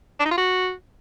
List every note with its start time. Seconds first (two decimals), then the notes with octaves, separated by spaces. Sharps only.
0.19 D4
0.25 D#4
0.31 F4
0.37 F#4